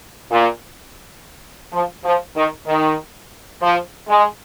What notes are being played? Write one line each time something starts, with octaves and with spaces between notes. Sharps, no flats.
A#2
F3
F3
D#3
D#3
F3
G#3